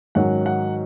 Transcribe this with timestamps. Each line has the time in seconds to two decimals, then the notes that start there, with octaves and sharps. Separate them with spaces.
0.15 G#2 D#3 F#3 C#4 F#5
0.46 F#5